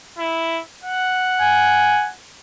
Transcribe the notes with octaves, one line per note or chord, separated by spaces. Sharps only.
E4
F#5
G#5